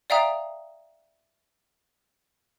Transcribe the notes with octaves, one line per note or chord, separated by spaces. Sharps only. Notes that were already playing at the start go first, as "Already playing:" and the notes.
D5 E5 F5 G5 A#5 D#6